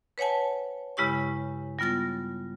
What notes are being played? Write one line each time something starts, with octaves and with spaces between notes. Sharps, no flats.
B4 C#5 F#5 G#5 A5
G2 C#3 G#3 E4 G4 C#6
G3 B3 F4 A6 A#6